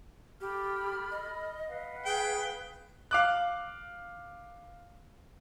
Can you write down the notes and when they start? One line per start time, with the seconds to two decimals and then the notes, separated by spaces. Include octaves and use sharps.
0.41 G4 A4 B5 F6
1.11 D#5
1.68 B4 F5 F#5
2.05 G#4 G5
3.11 F5 D6 F#6